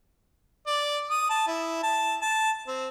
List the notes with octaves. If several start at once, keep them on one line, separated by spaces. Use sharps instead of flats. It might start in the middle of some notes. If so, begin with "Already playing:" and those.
D5
D#6
A5
E4
A5
A5
C4